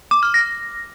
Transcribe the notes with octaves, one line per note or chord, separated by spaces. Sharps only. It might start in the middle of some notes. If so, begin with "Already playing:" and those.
D6
F6
A#6